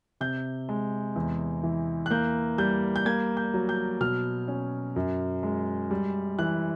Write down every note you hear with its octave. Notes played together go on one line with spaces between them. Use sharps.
C3 G6
G#3
E2
E3
F#6
A#3 G6
G3 G6
G6
A#3 G#6
G6
F#3
G6
B2 F6
C#4
F#2
G#3
G3
E3 F#6